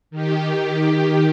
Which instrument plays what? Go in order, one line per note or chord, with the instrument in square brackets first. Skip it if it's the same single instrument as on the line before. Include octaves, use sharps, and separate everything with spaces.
[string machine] D#3 G4